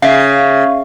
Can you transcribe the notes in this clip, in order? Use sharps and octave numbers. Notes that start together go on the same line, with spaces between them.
C#3 E5 F5